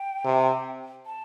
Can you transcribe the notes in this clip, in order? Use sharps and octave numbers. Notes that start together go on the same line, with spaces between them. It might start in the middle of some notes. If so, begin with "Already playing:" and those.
Already playing: G5
C3
A5